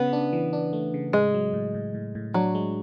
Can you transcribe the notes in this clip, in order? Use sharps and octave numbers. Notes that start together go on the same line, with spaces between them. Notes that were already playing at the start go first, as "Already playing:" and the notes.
Already playing: C#3 B3 C#4
D4
E3
D4
A3
C#3
A2 G#3
F#3
A2
A2
A2
A2
F#3 D4
G#3